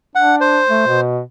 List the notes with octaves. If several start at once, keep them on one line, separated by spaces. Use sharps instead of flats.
D4 F#5
C5
A3
B2